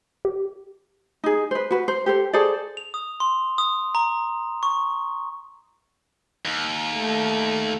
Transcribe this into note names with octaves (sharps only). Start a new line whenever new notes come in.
G4
D#4 G#4
B4 C5
F#4 B4
C5
G4 A4 C5
G#4 A4 C5 D5
F7
D#6
C6
D#6
A#5
C#6
D#2
A3